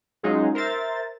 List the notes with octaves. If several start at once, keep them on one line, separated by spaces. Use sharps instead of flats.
F#3 G#3 C#4 D#4 F4 G#4
A#4 C5 E5 A6